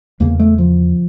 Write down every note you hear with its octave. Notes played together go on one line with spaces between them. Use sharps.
E2 C#3 A#3
A3
F3